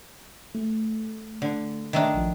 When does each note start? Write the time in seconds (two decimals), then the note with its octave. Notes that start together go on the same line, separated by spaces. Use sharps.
0.55 A3
1.42 D3
1.93 D#3 A3 D4
2.14 A#1 F3